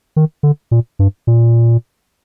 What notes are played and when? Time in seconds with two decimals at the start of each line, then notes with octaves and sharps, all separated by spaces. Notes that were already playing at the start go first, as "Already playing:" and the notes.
0.16 D#3
0.43 D3
0.71 A#2
0.99 G2
1.27 A#2